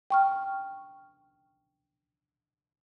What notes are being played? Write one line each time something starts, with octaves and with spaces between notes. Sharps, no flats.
G5 C#6 F6